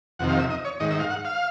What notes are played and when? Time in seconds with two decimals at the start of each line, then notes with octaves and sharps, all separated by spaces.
0.19 F2 C3 D#3 F#5
0.29 F5
0.39 E5
0.50 D#5
0.65 C#5
0.80 G#2 D#3 D#5
0.91 E5
1.00 F5
1.10 F#5
1.25 F5